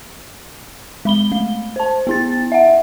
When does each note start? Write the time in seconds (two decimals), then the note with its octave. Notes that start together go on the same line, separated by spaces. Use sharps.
1.05 G#3 B5 G7
1.32 A3
1.76 C5 A5
2.07 B3 E4 A6
2.52 E5 F#5